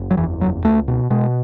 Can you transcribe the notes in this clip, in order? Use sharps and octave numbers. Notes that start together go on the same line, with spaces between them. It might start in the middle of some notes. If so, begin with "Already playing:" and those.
Already playing: F#1
F#3
E2 E3
F#1 F#3
C#2 A3
B2
B2 G#3